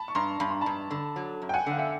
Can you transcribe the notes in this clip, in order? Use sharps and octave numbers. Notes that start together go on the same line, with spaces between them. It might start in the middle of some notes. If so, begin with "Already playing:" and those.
Already playing: A5 B5
C#6
G2 A#5 C6
G2 B5
C6
G2 A5 B5
D3
F#3
F#2
G5
F#5 G#5
D3 F5
E5 F#5